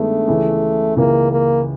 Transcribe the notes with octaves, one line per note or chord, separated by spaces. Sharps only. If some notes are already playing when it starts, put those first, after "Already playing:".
Already playing: G2 D#3 G#3 A3 B3
C#2 C#3 E3
C#2 C#3 E3 A#3
A#3